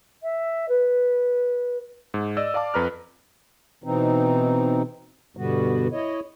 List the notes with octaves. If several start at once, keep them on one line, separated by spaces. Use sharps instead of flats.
E5
B4
G#2
D5 D#5 E6
D5 F5 A5 D6
F2 B4 A#5 F6
B2 E3 C4 D#4
G2 B2 D3 G3 B3 F#4
E4 C#5 D#5